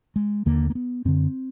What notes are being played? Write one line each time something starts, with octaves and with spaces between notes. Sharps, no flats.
G#3
D#2 D3 A#3
A#3
B3
F#2 D3 C4